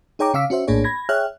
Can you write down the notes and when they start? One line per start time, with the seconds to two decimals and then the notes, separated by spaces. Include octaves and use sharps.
0.19 D#4 G#4 C#5 G5 A#5 D6
0.34 C#3 C#4 F5 D6 E6 B6
0.50 C#4 F#4 C5 E5
0.67 A#1 A2 A#3 D4 G#4 C#5
0.84 B5 G#6 A#6
1.09 G#4 C#5 E5 G5 F6 F#6